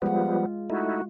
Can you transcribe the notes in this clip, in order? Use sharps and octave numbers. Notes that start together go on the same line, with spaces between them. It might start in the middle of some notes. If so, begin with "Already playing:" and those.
F3 G3 G#3 B3 F4 F#5
A3 D#4 E4 F#4